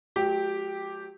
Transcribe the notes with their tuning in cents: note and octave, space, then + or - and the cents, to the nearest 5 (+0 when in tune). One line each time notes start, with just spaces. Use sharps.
F#3 -30 A3 -45 G4 +0